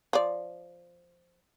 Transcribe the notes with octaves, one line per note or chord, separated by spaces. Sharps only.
F3 D5